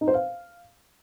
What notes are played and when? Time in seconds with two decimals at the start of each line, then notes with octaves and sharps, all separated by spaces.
0.01 D#4
0.08 C5
0.14 F5